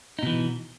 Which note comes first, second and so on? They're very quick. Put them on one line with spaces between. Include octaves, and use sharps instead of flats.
D#4 B2 E3